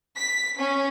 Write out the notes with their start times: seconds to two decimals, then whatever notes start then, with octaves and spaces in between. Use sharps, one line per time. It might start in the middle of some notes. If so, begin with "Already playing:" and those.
0.16 B6
0.57 C#4